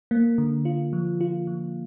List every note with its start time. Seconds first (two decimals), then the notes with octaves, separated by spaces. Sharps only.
0.11 A#3
0.38 D3
0.65 F4
0.93 F3
1.21 F4
1.47 F3